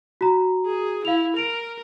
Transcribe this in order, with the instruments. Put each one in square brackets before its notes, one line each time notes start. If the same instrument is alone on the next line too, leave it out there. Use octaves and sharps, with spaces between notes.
[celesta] F#4 A#5
[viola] G#4
[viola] E4 [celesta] F5 F7
[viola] A#4 [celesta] D7 F7